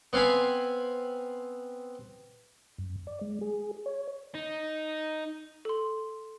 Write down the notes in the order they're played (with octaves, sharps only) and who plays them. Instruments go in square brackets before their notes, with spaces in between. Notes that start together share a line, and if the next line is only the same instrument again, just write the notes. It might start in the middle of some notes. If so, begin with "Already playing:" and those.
[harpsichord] B3 C4 F5 G#5 B5
[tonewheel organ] F#2
D5
G#3
G#4
C#5
[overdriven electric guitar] D#4
[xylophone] A4 C6